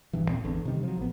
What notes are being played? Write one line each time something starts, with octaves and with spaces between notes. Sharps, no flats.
D1 G2 E3
D#2 A#2 C4
G#1 E2 D3
C3 D#3 G3
F3 F#3
A1 B3